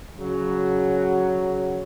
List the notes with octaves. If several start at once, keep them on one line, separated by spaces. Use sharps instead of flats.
C#3 F#3